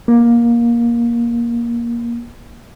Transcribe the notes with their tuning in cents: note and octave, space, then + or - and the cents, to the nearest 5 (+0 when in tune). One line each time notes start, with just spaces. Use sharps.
A#3 +15